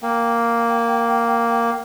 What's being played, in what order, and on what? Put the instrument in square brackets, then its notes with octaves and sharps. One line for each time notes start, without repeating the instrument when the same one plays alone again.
[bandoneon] A#3 [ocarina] G5